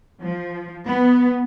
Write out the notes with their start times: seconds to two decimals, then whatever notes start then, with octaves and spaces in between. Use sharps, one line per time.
0.22 F3
0.87 B3